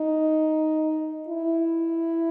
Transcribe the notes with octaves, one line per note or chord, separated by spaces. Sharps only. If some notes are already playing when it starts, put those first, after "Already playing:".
Already playing: D#4
E4